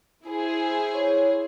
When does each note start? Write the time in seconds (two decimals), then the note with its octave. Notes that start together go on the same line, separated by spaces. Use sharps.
0.25 E4 G#4 C5
0.93 C#5